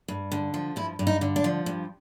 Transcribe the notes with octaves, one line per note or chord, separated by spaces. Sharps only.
G2
D3
F3
G2 E4
G2
D#4
D3
D4
F3
G2